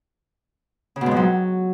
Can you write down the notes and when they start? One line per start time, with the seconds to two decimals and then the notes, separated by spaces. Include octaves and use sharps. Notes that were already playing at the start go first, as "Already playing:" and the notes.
0.96 C#3
1.01 B2
1.06 G#2
1.11 F2
1.16 F#3